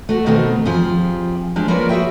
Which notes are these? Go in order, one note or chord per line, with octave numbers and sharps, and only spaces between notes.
A3 F#4
B2 D#3 A3 B3 C4
F2 F3 F4 G4 G#4
F3 G#3 D4 F4 G4
A#3 F4 A#4 B4 C#5 D5
F#4 G#4 E5 G5